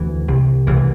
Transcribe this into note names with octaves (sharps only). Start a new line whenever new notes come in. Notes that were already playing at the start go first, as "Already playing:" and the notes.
Already playing: D2 D3 E3
C2 C3
C2 C3 E3